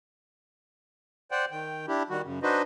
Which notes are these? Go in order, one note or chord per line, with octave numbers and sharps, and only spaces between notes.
C5 D5 F#5 G5
D#3 G5
D4 E4 G4
D#3 G3 F#4
F#2 C#3
D4 D#4 F#4 B4 C5 D#5